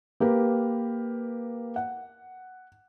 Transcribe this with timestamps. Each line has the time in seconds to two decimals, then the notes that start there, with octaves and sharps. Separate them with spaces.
0.20 A#3 G4 A#4 B4
1.76 F#5